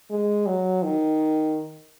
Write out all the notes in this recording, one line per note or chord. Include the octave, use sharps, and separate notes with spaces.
G#3
F#3
D#3